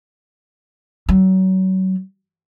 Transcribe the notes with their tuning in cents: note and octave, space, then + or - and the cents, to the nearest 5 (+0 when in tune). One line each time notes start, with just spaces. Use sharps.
F#3 +30